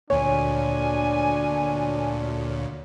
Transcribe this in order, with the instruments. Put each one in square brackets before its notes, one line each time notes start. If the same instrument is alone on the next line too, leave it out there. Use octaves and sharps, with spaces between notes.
[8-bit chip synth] D2 A#2 [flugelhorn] D4 [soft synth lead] C#5 [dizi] G#5